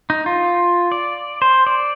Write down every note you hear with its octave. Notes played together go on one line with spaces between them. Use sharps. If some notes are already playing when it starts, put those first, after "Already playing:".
D#4
F4
D5
C5
D5